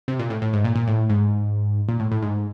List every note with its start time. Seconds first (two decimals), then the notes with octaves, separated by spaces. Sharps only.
0.08 C3
0.19 A#2
0.30 A2
0.42 A2
0.53 G#2
0.64 A#2
0.76 A#2
0.87 A2
1.10 G#2
1.89 A#2
2.00 A2
2.12 A2
2.22 G#2